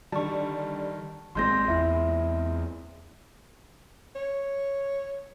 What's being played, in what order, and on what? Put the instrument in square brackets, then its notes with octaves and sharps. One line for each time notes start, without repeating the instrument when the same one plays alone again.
[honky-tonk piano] D3 G3 [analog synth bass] D#3 [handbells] A5 C#6
[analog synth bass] G#1 [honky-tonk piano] A#2 G#3 C4 [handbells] C6 G6 A#6
[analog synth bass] E2 [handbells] E4 E5
[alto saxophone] C#5